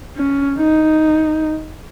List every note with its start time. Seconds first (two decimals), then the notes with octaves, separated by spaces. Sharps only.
0.16 C#4
0.58 D#4